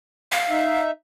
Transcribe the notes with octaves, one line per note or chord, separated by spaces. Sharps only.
F5
D#4 E5